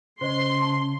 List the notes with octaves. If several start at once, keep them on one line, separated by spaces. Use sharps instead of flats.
C#3 C5 C#5 D#5 C6
A5